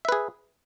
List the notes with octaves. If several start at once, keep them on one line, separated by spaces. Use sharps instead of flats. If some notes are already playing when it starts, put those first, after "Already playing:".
G#4 B4 E5